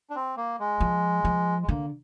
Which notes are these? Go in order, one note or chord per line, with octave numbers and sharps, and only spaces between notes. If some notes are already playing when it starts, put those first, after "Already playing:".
D4
C4
A#3
G#3
F3
F3
G#3
D3 A#3